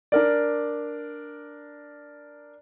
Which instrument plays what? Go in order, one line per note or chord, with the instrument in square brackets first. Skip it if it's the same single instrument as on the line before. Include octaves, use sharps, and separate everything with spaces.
[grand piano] D4 A#4 D5